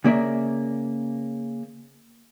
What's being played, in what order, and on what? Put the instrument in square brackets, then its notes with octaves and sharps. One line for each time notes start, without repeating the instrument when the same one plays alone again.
[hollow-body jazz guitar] C#3 A#3 D5 E5